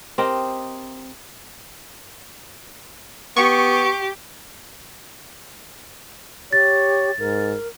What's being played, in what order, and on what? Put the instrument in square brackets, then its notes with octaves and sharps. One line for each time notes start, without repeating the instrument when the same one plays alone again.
[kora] C4 G4 A#4 D#5
[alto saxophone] B3 [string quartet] G4 [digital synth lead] C#6
[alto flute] G4 [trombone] C#5 [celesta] A6
[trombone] G#2 [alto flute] A#4